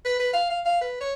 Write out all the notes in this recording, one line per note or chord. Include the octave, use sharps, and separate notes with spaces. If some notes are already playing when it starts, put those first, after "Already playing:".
B4
B4
F5
F5
F5
B4
C#5